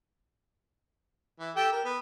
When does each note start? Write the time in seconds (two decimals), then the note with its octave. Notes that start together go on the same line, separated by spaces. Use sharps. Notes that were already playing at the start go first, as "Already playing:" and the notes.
1.40 E3
1.56 G4 A4 G5
1.72 A#4
1.85 B3